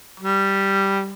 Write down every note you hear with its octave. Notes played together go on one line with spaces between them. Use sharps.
G3